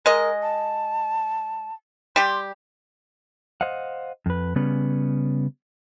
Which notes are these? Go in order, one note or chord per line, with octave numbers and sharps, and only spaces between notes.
G#3 A#4 D#5
A5
G3 G4 C6
C5 D#5 F5 F#5
F2 B4
C#3 G3 B3 C#4 B4